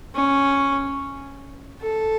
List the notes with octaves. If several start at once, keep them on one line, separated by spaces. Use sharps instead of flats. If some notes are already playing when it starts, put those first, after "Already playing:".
C#4
A4